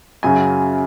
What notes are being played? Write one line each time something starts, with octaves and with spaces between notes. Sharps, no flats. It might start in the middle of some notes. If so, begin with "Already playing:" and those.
F#2 C#3 F#3 G#5